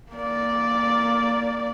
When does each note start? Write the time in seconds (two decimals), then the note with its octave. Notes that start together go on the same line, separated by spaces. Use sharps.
0.13 A#3 D5